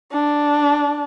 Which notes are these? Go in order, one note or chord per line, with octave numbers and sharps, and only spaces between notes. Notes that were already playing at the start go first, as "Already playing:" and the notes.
D4